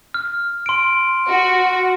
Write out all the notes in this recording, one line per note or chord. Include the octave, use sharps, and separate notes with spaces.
F6
C6 D7
F#4